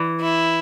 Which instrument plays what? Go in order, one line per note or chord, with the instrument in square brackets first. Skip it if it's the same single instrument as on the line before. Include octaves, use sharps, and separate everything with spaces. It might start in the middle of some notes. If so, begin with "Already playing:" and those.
Already playing: [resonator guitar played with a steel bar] E3
[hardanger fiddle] E4